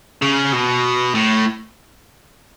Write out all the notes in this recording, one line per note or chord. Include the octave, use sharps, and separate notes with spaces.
C#3
B2
A2